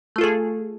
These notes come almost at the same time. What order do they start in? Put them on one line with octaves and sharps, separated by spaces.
A3 F4 A4 G#4